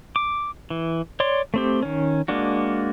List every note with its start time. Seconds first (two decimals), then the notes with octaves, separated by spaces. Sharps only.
0.16 D6
0.70 E3
1.20 C#5 D5 C6
1.54 A3 C4 G4
1.83 D#3 C#4
2.28 G#3 A#3 D4 F#4